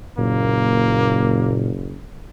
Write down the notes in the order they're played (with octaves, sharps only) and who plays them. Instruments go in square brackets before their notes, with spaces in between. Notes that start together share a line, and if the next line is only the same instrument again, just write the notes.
[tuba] F#1 [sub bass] A#2 [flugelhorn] A#3